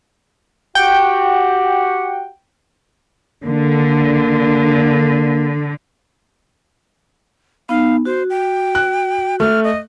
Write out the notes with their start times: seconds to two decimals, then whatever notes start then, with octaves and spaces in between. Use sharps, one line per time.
0.75 F#4 G4 F#5 G5
3.45 D3 A#3
7.69 B3 D#4 F5
8.05 F#4 C5
8.30 G5
8.75 F#6
9.40 A3 F6
9.64 D#5